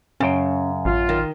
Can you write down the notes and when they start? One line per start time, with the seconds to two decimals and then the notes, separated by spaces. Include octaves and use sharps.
0.20 F#2 C#3 C#4 G5
0.85 A1 F4
1.09 D#3